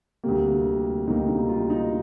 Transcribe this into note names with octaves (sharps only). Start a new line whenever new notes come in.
D2 C3 G3 A#3 G4
D2 C3 G3 A#3 D#4
D#4
F4
D#4